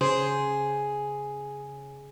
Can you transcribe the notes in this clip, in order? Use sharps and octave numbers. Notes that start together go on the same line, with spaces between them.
C#3 G#4 C5